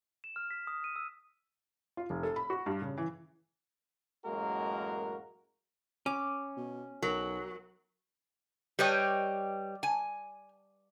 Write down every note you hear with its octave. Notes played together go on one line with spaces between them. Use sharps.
E7
F6
B6
D#6
D#7
E6
F4
F1
A4
B5
F#4
G2
C#3
E3
A1 F#2 G#3 A#3 F#4 A#4
C#4 D6
B2
B1 F#3 A#4
G3 B4 C#5 D#5 G5
G#5